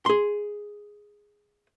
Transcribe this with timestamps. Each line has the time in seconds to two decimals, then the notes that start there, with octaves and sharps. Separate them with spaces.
0.06 G#4 C6